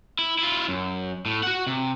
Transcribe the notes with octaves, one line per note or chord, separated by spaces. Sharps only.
E4
E4 F4
F#2
A2
F#4 F#5
C3